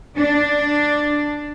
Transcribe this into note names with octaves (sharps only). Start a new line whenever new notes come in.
D4